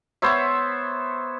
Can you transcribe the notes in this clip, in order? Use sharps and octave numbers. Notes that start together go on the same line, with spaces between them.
B3 C5 C#5 E5